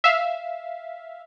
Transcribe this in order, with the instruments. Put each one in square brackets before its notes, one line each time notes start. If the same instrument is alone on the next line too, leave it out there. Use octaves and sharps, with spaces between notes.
[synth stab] E5 F5